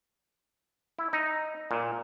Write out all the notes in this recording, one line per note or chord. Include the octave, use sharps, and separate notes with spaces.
E4
D#4
A#2